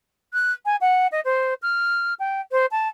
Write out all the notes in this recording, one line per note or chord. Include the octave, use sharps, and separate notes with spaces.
F#6
G#5
F#5
D#5
C5
F6
G5
C5
A5